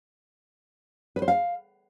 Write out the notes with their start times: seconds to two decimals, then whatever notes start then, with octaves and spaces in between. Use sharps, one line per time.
1.16 B4
1.22 C5
1.28 F5